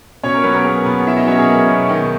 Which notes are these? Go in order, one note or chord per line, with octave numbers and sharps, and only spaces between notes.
B2 C#4 C#5
A#4
F#3 B3 B4
A#4
A#3 G#4
B2 B3 B4
B2 E4 E5
D#4 D#5
F#3 C#4 C#5
G#4
A#3
B2
D#3